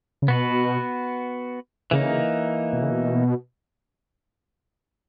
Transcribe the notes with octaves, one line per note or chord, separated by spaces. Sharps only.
C#3
B2 B3 F#4 B4
C#3 E3 A#3 D#4
B2
C#3
B2